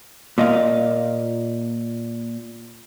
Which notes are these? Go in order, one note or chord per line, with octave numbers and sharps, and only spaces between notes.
A#2 D#5 F5